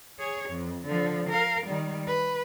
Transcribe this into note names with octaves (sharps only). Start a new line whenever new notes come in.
G#4 C#5
F2
D3 F3
A#4 F5
D#3 G3
B4